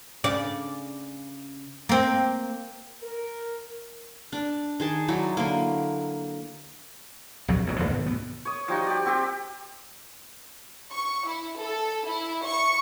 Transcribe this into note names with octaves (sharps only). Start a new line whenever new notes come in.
C#3 D5
A#3 C4
A#4
D4 D5
D#3 G#4 A5
F#3 D#4 E4 D5
D3 A#3
A#1 F2 C3 F#3
B1 G2 C#3 F#3
F#2 A2 D3 F3
G#2 B2 D#3
D2 F3 B3
C#5 D#6
F3 G3 D#4 F#4
G4 D5
C4 F#4 G4
C#6
E4
A4
E4
C#6